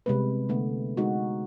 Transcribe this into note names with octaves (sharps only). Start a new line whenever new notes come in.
C3 G3 G#3 B3 B4
D3 A3 B3
G#3 D#4 F#4